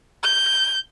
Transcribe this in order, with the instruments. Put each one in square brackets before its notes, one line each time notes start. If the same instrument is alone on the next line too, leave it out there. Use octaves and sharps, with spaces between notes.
[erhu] G6